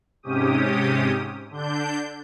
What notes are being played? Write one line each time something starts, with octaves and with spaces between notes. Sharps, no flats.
G#2 C3 C#4 G4 D#6
D3 D4 G6